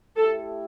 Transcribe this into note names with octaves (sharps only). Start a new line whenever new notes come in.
A3 E4 G4 A4 E5